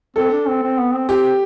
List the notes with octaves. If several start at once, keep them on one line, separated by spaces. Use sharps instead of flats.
C4 A4
D4
C4
C4
B3
C4
C4 G4